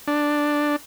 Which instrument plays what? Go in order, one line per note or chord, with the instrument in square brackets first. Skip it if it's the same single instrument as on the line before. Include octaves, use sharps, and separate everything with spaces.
[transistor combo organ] D4